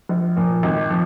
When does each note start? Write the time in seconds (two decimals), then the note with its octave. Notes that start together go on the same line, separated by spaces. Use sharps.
0.09 A#1
0.37 A#2 F3
0.63 G#1
0.90 F3